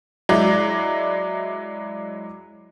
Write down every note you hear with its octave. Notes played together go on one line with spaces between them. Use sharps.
F#3 G#3 E4 D5